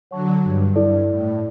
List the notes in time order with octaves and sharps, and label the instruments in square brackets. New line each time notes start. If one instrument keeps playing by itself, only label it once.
[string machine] D3 F#3 [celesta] C#5 F#5 A5 C#6
[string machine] G2
[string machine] G2 [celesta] E4 A4 D5
[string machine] A2